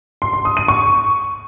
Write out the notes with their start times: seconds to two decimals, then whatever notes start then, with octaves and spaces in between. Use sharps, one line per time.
0.22 C6
0.33 C6
0.45 D#6
0.57 D#7
0.68 C#6